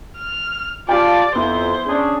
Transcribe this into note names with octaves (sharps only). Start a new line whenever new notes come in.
F6
F4 G4 D5 F5 G5 A5
F2 B3 E4 C5
C#4 D4 G#4